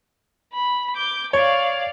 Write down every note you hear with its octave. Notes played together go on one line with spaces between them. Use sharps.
B5
D6 G6
C#5 D5 F5